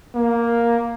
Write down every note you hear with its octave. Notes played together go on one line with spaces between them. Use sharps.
A#3